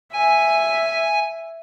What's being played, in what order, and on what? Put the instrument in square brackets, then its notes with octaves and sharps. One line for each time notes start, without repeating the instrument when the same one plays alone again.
[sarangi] E5 [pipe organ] G#5